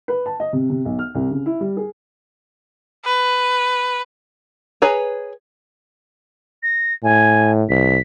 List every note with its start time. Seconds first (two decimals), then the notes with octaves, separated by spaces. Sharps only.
0.08 B4
0.26 A5
0.40 D#5
0.53 C3
0.70 C3
0.85 B1
0.99 F6
1.15 C2
1.31 C#3
1.46 E4
1.60 G3
1.77 G#4
3.04 B4
4.82 G#4 B4 C#5 A#5
6.63 A#6
7.03 A2 G#5
7.69 C2 B6